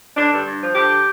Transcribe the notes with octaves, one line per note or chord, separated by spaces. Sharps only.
D3 D4
G2
G2
F3
D3 G4